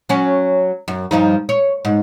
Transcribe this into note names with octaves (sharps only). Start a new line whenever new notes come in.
F#3 C#4
F#2
G2 F3 D#4
C#5
G#2